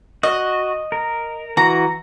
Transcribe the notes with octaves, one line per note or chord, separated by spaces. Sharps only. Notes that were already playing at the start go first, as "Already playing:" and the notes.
F#4 D#5
A#4
E3 F#4 A#5